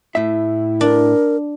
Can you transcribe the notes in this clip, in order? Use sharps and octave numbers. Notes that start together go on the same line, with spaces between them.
A2 E4 E5
D4 A#4